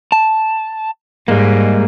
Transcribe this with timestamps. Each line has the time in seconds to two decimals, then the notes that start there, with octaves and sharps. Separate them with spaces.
0.12 A5
1.28 G#2 G3 G#3 A#3